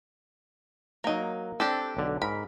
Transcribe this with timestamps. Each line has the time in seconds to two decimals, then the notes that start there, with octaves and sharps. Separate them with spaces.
1.04 F#3 A#3 D#4 A#5
1.60 C4 D4 G4 A4
1.97 B1 D3
2.22 G#2 A#4 B5